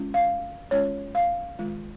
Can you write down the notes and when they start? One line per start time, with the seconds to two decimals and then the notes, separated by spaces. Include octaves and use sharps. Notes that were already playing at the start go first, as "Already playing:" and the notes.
Already playing: G#3 C#4 F4
0.14 F5
0.71 G#3 C#4 F4 C#5
1.15 F5
1.59 D#3 G#3 F4